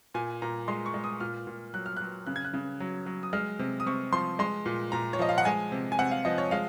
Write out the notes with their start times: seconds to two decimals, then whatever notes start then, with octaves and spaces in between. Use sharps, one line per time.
0.14 A#2 G#5
0.42 A#2 A#5
0.68 G#3 C6
0.86 C#6
0.94 G#3
1.04 D#6
1.20 A#2 F6
1.47 A#2
1.74 F#3 F#6
1.86 F6
1.97 F#3 F#6
2.26 C#3 F#6
2.36 G#6
2.44 F#6
2.54 C#3
2.80 F#3
3.06 F#3
3.23 D#6
3.33 G#3 F6
3.59 C3
3.80 D#6
3.86 C3 C#6
4.12 F3 C6
4.39 G#3 C6
4.66 A#2
4.92 A#2 A#5
5.13 C#5
5.19 F3 D#5
5.29 F5
5.38 F#5
5.45 G#3 G#5
5.72 C3
5.92 G#5
5.99 C3 F#5
6.11 F5
6.25 F3 D#5
6.38 C#5
6.51 G#3 F5